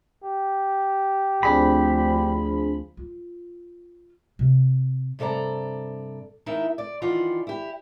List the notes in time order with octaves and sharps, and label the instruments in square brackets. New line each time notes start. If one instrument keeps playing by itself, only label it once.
[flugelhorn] G4
[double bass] D2 F3 [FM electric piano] C4 D4 G#4 [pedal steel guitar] B5
[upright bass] F4
C3
[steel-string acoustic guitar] G2 C3 A4 D5 A#5
E2 D#4 E4 A#4 E5
D5
D#3 E3 F4 D5 F#5
E4 G4